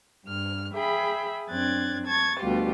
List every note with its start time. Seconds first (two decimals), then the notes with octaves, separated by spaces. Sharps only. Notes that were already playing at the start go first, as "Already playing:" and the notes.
0.25 G2 F6
0.73 G#4 E5 G5 B5
1.49 F#2 C4 D4 F#6 G#6 A6
2.07 A5 C#6 G#6 A6
2.39 D2 B2 G3 F4 G4